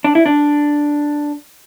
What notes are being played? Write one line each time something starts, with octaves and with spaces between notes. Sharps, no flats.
D4
E4
D4